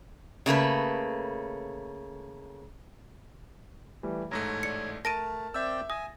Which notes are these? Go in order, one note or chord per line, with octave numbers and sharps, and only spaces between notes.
C#3 A3 A#3 B4
E3 G3 A3
A1 G#2 A3 C#5 A#5 A#6
D5 C#7
A3 A#4 A5 A6 A#6 D7 D#7
C4 D5 E5 G5 E6
G#5 D#6 A#6